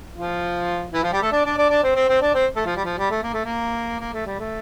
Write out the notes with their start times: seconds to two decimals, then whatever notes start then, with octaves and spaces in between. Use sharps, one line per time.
0.16 F3 F4
0.93 E3 E4
1.03 F3 F4
1.12 G3 G4
1.22 A3 A4
1.32 D4 D5
1.44 D4 D5
1.57 D4 D5
1.70 D4 D5
1.83 C4 C5
1.95 C4 C5
2.08 C4 C5
2.21 D4 D5
2.34 C4 C5
2.56 A3 A4
2.65 F3 F4
2.76 G3
2.85 F3
2.98 G3
3.10 A3
3.23 A#3
3.33 A3
3.44 A#3
4.00 A#3
4.13 A3
4.26 G3
4.39 A3